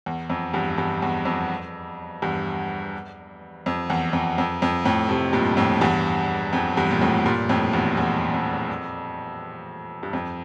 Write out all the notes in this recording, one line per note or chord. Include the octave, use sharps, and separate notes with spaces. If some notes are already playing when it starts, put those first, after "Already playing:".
E2
F2
E2 G2
E2 G2
E2
F2
E2 G2
F2
E2
F2
F2
F2
F2 A2
A2 C3
G2 A#2
F2 A2
E2 G2
F2
E2 G2
A#2
F2 A2
G2 A#2
F2 A2
E2 G2
E2
F2
G2
F2